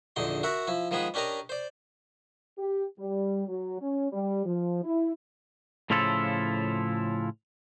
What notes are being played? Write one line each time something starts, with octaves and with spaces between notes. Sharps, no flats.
A#1 E2 D3 D#4 C6
F#4 A#4 E5 F#5
F3 E4
D#3 F3 G#3 B3 G#4 B4
C#4 D4 G4 A#4 D#5 A#5
C5 D5
G4
G3
F#3
C#4
G3
F3
E4
A2 C#3 F3 E4 F4 A4